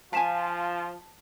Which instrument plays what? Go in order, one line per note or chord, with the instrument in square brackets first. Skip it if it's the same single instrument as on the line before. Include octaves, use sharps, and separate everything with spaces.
[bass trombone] F3 [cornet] F4 [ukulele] F5 G#5 [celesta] A5 B6 E7